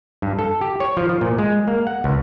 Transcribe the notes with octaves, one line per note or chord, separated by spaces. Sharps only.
G2
A4
G4
C#5
F3
F3
A#2
G#3
A#3
F#5
C#2